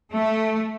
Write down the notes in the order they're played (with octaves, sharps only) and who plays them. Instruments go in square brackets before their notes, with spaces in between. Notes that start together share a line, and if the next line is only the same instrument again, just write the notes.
[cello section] A3